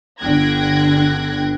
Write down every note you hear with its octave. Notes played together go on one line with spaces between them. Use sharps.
G1 D3 G5 F#6 G#6 A#6